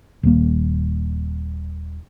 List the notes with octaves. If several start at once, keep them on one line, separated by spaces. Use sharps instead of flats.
D#1 A#3